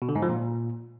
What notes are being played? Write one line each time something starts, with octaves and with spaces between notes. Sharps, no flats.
B2
D3
G#2
F3
A#2